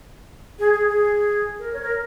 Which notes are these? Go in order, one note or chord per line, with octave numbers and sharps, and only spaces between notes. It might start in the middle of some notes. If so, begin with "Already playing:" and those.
G#4
G#4
G#4
A#4
C#5
A#4